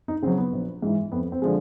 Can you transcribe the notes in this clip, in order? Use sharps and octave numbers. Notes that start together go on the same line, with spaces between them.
D#4
C#3 F#3 C4
B3
A#1
G#2 E3
F2 B3
C4
D3 F3 G#3